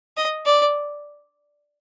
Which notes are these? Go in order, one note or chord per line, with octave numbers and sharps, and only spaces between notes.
D#5
D5